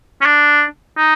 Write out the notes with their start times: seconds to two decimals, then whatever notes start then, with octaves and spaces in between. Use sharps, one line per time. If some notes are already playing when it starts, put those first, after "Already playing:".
0.21 C#4
0.26 D4
0.98 D#4